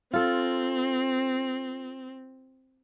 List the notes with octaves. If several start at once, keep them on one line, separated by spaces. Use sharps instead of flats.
C4 F4 A4